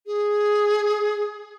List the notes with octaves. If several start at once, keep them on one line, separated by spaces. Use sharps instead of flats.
G#4